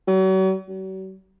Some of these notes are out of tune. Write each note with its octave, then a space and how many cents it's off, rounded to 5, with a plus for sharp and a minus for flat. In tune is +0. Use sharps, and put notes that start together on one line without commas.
F#3 +40
F#3 +45